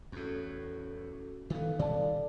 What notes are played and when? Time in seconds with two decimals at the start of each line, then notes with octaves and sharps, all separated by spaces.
0.12 E2 A2 C#4 F#4 A4
1.50 D#3 E3 B3 A4 F5
1.79 B2 D#3 G3 D5 A5